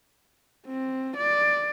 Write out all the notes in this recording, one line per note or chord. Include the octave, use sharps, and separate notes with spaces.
C4
D5